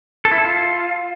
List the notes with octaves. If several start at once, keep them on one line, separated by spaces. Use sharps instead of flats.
A4
E4
A4
F4